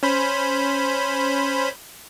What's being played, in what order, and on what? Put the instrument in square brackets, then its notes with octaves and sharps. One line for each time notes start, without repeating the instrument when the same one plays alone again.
[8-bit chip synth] C#4 C5 B5